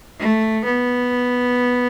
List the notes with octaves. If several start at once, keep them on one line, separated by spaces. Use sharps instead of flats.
A3
B3